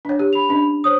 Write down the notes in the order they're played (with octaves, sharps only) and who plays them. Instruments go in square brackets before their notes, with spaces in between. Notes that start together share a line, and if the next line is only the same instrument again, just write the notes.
[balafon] D4 C#5
G4
[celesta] B5 F7
[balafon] C#4 D4
[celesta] C5 C#5 D#6